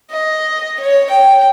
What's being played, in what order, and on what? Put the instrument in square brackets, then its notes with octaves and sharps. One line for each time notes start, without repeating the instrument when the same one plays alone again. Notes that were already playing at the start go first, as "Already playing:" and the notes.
[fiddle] D#5
C#5
G5